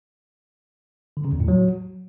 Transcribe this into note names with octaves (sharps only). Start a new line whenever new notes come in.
D3
C#3
E2
A2
F#3